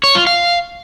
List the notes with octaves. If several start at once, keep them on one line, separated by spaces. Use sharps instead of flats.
C#5
F4
F5